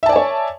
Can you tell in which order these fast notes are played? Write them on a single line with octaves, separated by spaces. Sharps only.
E5 A5 D5 G#5 C#5